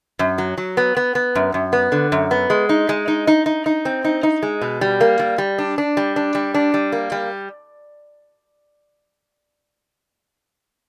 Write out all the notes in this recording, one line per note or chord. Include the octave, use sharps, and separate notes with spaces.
F#2
F#3
F#3
B3
B3
B3
F#2
F#2
B3
D3
F#2
B3
G#3
D#4
G#3
D#4
D#4
D#4
D#4
C4
D#4
D#4
G#3
B2
G3
A#3
G3
G3
D4
D4
G3
D4
G3
D4
G3
A#3
G3